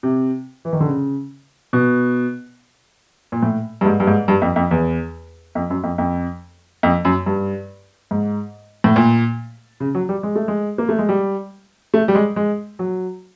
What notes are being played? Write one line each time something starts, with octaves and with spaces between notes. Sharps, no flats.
C3
E3
D#3
D3
C#3
B2
A#2
A2
G2
G#2
G2
G#2
G2
F2
F2
E2
F2
F#2
F2
F2
F2
F#2
G2
G#2
A2
A#2
C#3
F#3
G3
G#3
A3
G#3
A#3
A3
G#3
G3
A3
G3
G#3
G#3
F#3